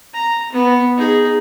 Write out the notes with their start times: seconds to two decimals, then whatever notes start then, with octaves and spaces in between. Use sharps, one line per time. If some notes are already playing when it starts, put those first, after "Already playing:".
0.14 A#5
0.53 B3
0.97 D#4 G#4